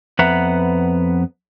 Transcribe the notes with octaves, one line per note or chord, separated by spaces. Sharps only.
F2 B3 B4 E5 F#5 A#5